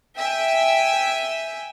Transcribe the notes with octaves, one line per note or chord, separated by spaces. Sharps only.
E5 G5 G#5